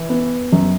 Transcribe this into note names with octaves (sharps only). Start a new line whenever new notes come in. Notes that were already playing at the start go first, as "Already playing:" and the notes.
Already playing: E3
B3
F#2